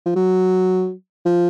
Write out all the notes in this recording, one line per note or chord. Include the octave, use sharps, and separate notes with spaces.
F3
F#3
F3